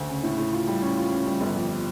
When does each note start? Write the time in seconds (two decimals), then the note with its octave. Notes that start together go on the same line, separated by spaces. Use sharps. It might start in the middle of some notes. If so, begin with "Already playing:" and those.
Already playing: D2 C#4
0.09 C#3
0.23 A2
0.38 A2
0.53 F4
0.67 G3
0.82 C#4
0.97 F4
1.11 C#4
1.26 G3
1.41 G1
1.55 F2